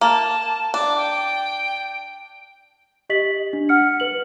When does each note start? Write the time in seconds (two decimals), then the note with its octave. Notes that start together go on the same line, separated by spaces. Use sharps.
0.01 A#3 A5
0.74 D4 D6
0.97 G5
3.10 G4 D#5 B6 F#7
3.53 D4
3.69 F#5 F6 C#7
4.00 B4 F#7